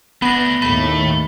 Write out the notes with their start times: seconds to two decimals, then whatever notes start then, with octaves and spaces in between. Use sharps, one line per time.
0.22 A3 B3 D4 B5 A#6
0.62 D#2 A2 D#3 A3 B5